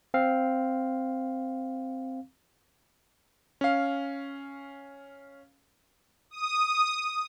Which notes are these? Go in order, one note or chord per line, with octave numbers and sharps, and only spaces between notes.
C4 F5
C#4 F5
D#6